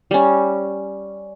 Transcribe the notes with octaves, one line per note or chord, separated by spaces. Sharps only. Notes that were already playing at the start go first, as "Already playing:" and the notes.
G3 C#4